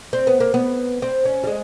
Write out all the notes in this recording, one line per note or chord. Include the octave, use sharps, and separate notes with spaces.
C4
B3
A#3
B3
C4
C#4
G3
G#3